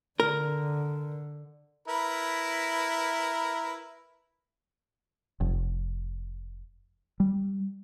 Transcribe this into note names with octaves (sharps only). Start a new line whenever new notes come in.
D3 A#4
E4 A#4 B4
F1
G3